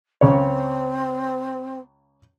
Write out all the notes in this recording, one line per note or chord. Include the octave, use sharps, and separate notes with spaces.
C#2 C#3 C4 C#5